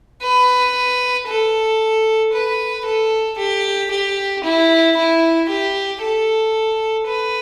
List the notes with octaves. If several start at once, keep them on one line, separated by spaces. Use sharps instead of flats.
B4
A4
B4
A4
G4
G4
E4
E4
G4
A4
B4